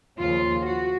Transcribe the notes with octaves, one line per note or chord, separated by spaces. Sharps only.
D#2 C#3 F3 F4
F#4